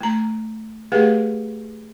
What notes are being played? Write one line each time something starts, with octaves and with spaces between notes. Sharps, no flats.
A3 A#5
A3 G4 G#4 B4 F5 F#5